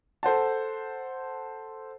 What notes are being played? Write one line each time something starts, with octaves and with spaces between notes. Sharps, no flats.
A4 C5 F#5 A5